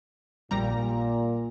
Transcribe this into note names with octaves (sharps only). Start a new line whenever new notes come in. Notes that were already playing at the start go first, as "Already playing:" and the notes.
A#1 A#2 G3 A#5